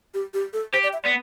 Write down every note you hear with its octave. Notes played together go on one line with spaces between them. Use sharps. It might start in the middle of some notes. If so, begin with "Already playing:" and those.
G4
G4
A4
G4 C5
D5
E5
B3 D5